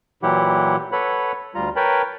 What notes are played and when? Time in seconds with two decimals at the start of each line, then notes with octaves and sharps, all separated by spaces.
0.23 A#2 E3 F#3 E4 G4 F#5
0.92 A4 B4 C#5 F#5 B5
1.55 D2 G3 F4 A#5
1.76 A#4 B4 C#5 G5 A5 B5